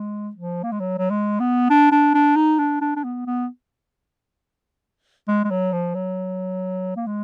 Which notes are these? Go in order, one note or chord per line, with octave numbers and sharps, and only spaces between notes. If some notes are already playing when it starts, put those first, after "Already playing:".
Already playing: G#3
F3
A#3
G#3
F#3
F#3
G#3
B3
D4
D4
D4
D#4
D4
D4
D4
B3
B3
G#3
G#3
F#3
F3
F#3
A#3
G#3